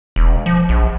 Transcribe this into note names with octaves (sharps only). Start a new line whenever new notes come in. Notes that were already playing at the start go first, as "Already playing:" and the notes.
E1
F3
A#1